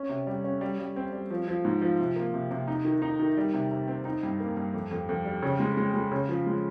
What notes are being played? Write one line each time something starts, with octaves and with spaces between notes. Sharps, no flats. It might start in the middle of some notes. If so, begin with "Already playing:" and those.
Already playing: C#4
C3
G3
C#4
G3
G3
C4
G3
F3
F3
G#2
F3
C3
A#3
C3
C3
D#4
D#3
D#4
D#3
G3
C3
C3
C4
D#4
G2
A#3
G2
F2
F2
F2
G3
C#3
G#3
G#3
G#3
C#3
F3
G#3